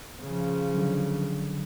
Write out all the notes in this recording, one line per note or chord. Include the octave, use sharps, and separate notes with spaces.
C#3 F3
D3 F#3